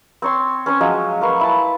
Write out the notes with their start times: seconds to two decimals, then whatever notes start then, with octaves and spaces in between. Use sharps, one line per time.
0.22 C4 C#5 C6
0.66 C#4 C5 C#5 D#6
0.81 F3 F#3 G#3 D#5
1.21 A#3 B4 C6 C#6
1.41 E4 A5